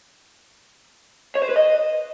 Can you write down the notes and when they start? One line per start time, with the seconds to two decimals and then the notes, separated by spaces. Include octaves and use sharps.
1.35 C#5
1.42 C5
1.49 B4
1.56 D#5